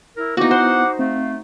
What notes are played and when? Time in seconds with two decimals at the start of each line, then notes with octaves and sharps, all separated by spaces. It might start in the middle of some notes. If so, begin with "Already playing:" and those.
0.16 E4 A#4
0.37 A#3 B3 D#4 E4 F#4 D6
0.51 C5 F#5
0.99 A3 C4 F5